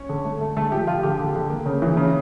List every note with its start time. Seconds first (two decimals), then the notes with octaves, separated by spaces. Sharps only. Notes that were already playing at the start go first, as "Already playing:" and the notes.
Already playing: C#4 C#5
0.09 D3
0.25 A3
0.41 A3
0.57 D3 A3 A4
0.72 F3 G4
0.87 F3 F4
1.03 D3 G4
1.19 D3
1.35 D3
1.50 A#3
1.66 C#3
1.82 E3
1.97 C#3